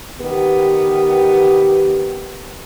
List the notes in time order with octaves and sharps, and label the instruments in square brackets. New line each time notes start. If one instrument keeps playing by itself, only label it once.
[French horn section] D#3 B3 G4